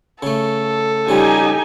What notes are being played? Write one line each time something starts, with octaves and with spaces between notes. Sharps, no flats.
C#3 A3 A4
C#3 F3 G3 D#4 G4 G#5